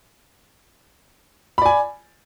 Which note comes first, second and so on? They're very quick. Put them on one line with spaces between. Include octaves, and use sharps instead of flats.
B5 D5 G#5